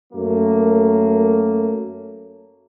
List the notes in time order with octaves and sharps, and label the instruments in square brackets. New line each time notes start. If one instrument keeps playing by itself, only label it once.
[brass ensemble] F#2 F#3 A3 A#3